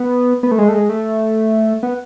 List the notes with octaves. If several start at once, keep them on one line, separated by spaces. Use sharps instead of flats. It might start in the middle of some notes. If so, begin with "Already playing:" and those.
Already playing: B3
B3
A3
G#3
A3
G#3
A3
B3